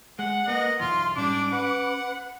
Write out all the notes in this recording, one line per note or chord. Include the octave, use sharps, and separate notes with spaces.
G#3 F#5
A#3 B3 D#5
B1 E2 F4 C6
G#2 G3 C#4 D4 D6
B4 F#5